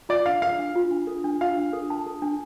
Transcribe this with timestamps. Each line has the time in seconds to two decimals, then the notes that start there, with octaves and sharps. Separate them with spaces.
0.09 F4 D5
0.25 D4 F5
0.42 A4 F5
0.59 D4
0.75 F4
0.91 D4
1.07 A4
1.24 D4
1.41 F4 F5
1.57 D4
1.73 A4
1.90 A5
2.06 A4
2.22 D4